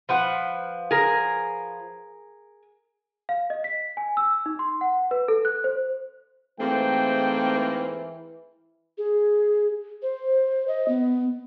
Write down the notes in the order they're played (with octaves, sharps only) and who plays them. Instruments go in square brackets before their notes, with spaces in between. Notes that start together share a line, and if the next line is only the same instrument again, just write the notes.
[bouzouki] F3 B4 F#5
[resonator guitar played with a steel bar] G#4 A#4
[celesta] F5
D#5
B6
G#5
E6
D#4
C6
F#5
B4
A4
F#6
C5
[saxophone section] G#2 A#3 C4 [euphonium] E3 [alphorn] A3 [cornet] G5
[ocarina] G#4
C5
D#5
B3